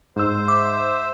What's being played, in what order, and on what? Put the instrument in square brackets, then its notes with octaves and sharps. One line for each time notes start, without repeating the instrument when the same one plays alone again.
[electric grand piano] G#2 E6 [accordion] C5
[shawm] E5 [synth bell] D6